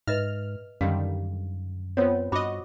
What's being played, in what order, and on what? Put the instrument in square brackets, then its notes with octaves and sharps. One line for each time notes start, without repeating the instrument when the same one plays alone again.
[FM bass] G#2 [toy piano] B4 D#5 E5 [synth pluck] F6
[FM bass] F#2 [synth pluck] D3 D#3 G3 [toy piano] F5
[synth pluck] B3 C4 [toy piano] F4 C5 C#5
[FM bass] G2 [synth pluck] F#4 D#5 [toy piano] B5 D6